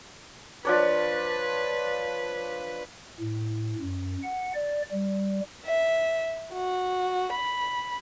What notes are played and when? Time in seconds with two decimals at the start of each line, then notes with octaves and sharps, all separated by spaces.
0.65 F3 D4 B4 C#5
3.20 A2
3.80 F#2
4.23 F#5
4.54 D5
4.92 G3
5.65 E5
6.53 F#4
7.31 B5